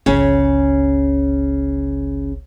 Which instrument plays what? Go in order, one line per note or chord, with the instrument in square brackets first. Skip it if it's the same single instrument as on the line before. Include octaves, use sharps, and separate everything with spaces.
[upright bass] G1 C#2 [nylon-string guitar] C#3 C#4